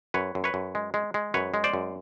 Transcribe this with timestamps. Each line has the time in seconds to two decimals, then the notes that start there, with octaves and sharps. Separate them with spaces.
0.14 F#2 B4 C#5
0.35 F#2
0.44 B4 C#5
0.54 F#2
0.75 G#3
0.94 G#3
1.14 G#3
1.34 F#2 B4 C#5
1.54 G#3
1.64 C5 D5
1.73 F#2